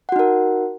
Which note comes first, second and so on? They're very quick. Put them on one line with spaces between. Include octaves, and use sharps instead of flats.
F#5 F#4 D#4 A#4